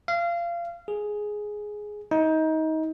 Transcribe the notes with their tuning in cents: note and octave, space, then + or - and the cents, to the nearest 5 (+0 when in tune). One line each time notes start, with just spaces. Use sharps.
F5 -25
G#4 +5
D#4 +25